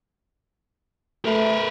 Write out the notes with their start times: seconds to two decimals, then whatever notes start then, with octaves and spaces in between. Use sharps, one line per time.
1.25 A3 A#4 B4